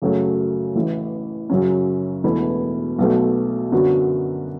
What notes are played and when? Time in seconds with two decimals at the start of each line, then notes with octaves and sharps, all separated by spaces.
0.02 F#2 C#3 F#3 A3
0.75 A1 A2 E3
1.50 F#2 C#3 F#3 C#4
2.23 E1 E2 B2 A3 E4
2.98 B1 B2 F#3 A3
3.72 F#2 D3 F#3 B3 F#4